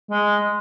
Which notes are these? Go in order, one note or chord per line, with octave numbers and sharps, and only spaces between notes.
G#3